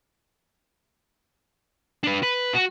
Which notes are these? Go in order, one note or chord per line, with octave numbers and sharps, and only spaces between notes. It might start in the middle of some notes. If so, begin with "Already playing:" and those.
D4 B4
B4
F#4